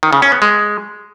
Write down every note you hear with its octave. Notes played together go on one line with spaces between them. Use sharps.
D#3
C#3
C#4
B3
G#3